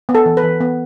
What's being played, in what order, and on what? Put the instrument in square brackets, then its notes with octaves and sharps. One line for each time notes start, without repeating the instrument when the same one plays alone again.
[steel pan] B3
A4
E3
B4
E3
B3